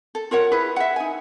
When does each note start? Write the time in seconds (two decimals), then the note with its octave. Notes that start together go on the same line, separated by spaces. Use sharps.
0.15 A4
0.31 F4 A#4 C#5 F#5
0.51 E4 G#4 B4
0.76 E5 F#5
0.96 D#4 G#5